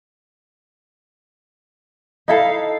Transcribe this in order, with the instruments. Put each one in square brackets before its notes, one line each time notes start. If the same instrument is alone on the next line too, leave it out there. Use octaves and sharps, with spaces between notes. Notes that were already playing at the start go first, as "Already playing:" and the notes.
[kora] D#4 E4 A4 [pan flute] F5